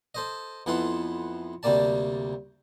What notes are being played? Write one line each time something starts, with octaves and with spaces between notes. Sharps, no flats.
A4 C5 D#5
F2 E3 B3 A4 F#5 C6
D2 C3 G3 A#3 D5 A5